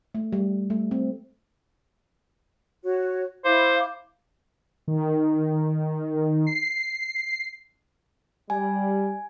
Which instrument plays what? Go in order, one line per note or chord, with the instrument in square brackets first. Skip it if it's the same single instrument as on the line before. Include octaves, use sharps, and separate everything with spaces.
[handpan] A3
G3
A3
C4
[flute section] F#4 C#5
[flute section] E4 F5 D6 [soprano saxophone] C5
[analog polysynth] D#3
C7
[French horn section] G3 [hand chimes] G#5